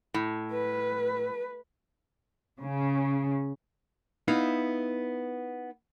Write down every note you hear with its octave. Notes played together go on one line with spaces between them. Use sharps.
A2
B4
C#3
B3 D#4 E4 F5